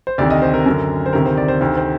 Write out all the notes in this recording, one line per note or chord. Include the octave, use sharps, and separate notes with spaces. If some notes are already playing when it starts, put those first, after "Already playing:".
C5
D2 C3 D#3 D5
D#5
C5
A#4
F#2 D3
C5
D2 C3 D#3 A#4
C5
D5
C5
D2 C3 D#3 C5
C5